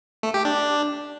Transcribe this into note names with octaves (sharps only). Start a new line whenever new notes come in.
A3
G4
D4